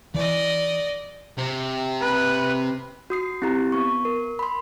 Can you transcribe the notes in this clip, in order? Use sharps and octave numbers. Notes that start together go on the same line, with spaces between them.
E3 D5 D#5
C3
B4
F#4 D#6 C7
C4 E4 G4 A#5
B3 C#6
A#4
B5 C6